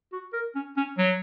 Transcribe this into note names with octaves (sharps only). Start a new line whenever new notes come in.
F#4
A#4
C#4
C#4
F#3